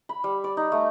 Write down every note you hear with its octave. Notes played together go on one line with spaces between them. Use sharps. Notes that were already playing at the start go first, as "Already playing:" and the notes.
B5
G3
D5
D#4
A3